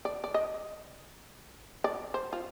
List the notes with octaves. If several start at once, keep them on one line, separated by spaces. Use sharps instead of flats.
D5
D5
D#5
D5
C5
F4